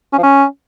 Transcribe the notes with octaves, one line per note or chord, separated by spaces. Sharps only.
C#4
F3
C#4